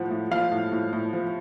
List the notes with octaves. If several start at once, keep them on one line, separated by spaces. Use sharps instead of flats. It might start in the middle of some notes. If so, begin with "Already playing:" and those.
Already playing: A2 F3 F#5
A2
F3 F5
A2
A2
A2
F3